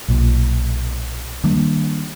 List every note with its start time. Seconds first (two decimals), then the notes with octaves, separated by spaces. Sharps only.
0.09 B1 A#2
1.44 D#3 G3 A#3 D4